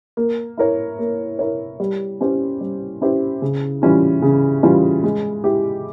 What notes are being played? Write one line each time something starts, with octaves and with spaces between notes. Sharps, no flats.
A#3
E4 A#4 C#5
A#3
E4 A#4 C#5
G3
C#4 E4 G4 C5
G3
C#4 E4 G4 C5
C#3
E3 G3 C#4 F4
C#3
E3 G3 C#4 F4
G#3
E4 G4